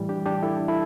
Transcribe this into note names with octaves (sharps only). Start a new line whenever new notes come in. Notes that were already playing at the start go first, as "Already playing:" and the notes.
Already playing: A2 E3 G3
D4 G4
D4 G4
E4 A4
E4 A4